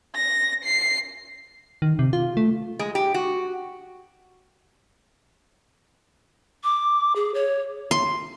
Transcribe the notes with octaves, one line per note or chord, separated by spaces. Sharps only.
A#6
C7
D#3
C3
F4
A3
G#3
G4
F#4
D6
G#4
C#5
C6